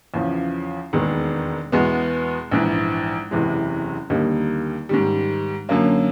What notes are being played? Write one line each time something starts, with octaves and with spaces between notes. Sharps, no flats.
E2 C#3 F3
E1 D#2 D#3 G#3 B3
E2 B2 G#3 B3
A#1 G#2 E3
F#1 E2 C3 E3 G#3
D#2 D3 G3 A#3 D#4
G#2 D#3 G3
F#2 D3 F#3 A#3 C#4